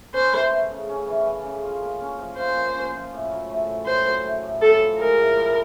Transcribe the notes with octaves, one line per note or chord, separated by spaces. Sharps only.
C#4 C5
E3
A3
C#3
C#4
E3
A3
C#3
F4
A#3
C#4
F3
F4 C5
A#3
C#4
F3
A2
F#3
A3
A2
A2 C5
F#3
A3
A2
A2 A4
F3
G#3 A#4
A2
A2